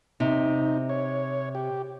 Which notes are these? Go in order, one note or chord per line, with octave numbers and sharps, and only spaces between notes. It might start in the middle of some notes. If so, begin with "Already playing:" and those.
C3 D#4
C#5
G4